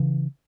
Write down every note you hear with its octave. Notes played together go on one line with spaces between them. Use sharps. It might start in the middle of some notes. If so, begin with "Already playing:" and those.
Already playing: C#3 E3